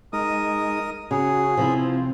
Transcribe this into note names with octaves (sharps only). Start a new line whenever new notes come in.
G#3 D#4 A#4 D#6
C#3 C#4 F#4 G#4
C3 F3 C4 E4